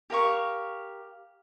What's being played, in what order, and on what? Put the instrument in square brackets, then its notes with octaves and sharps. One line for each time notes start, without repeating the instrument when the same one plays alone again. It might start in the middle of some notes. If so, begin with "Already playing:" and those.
[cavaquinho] G4 A#4 F5 C#6